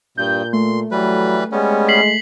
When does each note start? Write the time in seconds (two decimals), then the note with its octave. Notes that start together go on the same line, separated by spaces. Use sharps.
0.17 G2 A#2 G6
0.53 A3 C6
0.91 E3 F#3 G3 B4
1.52 G3 G#3 B3 C#4
1.88 B6 C7 F#7